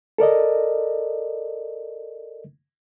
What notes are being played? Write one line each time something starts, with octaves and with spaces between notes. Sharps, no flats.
A4 A#4 D5 D#5